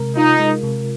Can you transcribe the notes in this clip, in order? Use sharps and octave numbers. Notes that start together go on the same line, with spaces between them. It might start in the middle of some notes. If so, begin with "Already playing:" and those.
Already playing: C3 G#3 A#4
D#4 F4
G#3
C3